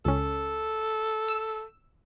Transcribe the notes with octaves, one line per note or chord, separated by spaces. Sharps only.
C#2 C#4 A4
E6